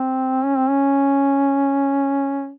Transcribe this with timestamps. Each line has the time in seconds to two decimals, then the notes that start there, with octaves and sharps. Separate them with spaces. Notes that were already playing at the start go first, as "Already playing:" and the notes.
Already playing: C4
0.45 C#4
0.57 C4
0.69 C#4